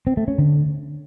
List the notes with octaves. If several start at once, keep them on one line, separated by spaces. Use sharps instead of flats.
C4
A3
C#4
D3